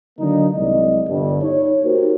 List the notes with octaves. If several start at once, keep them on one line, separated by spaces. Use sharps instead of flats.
D3 D#3 F#3 A#3 D4 D#4
C2 F#3 G#3 D5 D#5
G1 G2
D#4 C#5
A#3 D#4 F#4 G4 A#4 C5